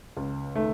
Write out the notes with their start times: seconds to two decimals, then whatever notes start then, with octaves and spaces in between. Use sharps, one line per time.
0.16 C#2
0.55 D#3 A3